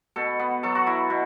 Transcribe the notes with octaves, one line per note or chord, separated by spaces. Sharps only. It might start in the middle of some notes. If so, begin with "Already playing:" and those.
B2 A4
B3
F#3 A4
F#4
E4
B2